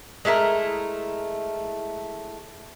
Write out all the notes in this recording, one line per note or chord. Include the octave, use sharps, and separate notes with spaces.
G#3 A3 E4 A#4